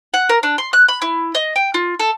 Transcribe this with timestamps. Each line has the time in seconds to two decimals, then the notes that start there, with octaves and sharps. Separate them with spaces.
0.14 F#5
0.29 A#4
0.43 D4
0.58 C6
0.73 F#6
0.88 B5
1.02 E4
1.35 D#5
1.56 G5
1.74 F4
2.00 A4